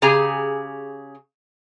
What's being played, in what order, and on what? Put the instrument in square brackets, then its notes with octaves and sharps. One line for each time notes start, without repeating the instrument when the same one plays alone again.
[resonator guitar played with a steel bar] C#3 G4 G#4 G#5 A#5